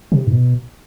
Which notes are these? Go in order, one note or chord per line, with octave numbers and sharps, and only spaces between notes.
C3
G#2
B2